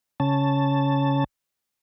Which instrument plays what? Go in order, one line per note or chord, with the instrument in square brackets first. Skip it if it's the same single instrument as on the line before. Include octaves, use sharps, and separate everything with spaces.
[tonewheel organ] C#3 C#4 A5